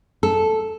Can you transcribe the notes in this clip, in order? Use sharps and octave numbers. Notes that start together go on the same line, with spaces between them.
A4